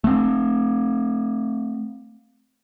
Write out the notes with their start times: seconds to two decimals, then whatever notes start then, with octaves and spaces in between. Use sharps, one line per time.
0.04 A3 C4